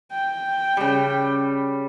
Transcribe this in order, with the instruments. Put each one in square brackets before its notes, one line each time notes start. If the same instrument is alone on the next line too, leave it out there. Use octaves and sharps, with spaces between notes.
[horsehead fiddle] G5
[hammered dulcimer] C#3 G3